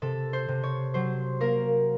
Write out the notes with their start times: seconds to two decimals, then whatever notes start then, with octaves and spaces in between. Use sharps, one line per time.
0.02 C3 A4
0.33 C5
0.48 C3
0.63 C#5
0.94 F#3 C5
1.40 A#3 A#4